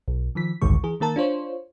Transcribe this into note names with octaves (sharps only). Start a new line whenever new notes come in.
B1
D#3 F3 B6
A1 D2 G2 D#3 G#3 C#6
E3 G#4
D#3 A#3 A#4 A5
D4 F4 C5 C#5